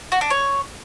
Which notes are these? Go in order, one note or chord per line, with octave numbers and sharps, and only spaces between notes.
F#4
D4
C#5